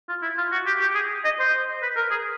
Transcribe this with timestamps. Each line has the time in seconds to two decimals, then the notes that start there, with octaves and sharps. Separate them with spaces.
0.09 F4
0.22 E4
0.38 F4
0.52 F#4
0.67 G4
0.81 G4
0.95 G#4
1.25 D#5
1.39 C5
1.82 B4
1.96 A#4
2.11 G#4